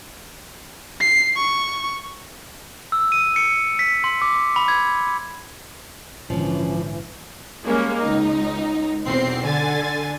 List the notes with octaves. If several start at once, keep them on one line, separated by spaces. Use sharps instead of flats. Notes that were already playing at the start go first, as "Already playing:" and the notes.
C7
C#6
E6
D#7
C#7
B6
C6
D6
B5
G#6
A#1 G#2 D3 E3 F3 C#4
G3 G#3 A#3 C#4
C#2 D#4
B1 E2 C4 C7
D3 G#5 A6